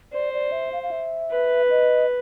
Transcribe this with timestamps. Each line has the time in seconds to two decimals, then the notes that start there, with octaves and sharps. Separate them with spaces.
0.13 C5 D5
0.33 D5
0.52 E5
0.73 F5
0.83 F5
0.91 E5
1.31 B4
1.70 D#5